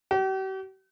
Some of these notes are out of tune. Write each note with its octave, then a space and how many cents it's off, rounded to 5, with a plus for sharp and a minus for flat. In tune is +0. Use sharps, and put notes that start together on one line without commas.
G4 -45